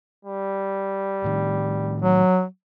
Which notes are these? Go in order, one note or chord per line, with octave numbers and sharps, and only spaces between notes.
G3
A2 D#3
F#3